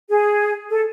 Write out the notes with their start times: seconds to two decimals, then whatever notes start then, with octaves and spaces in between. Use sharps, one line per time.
0.09 G#4
0.70 A4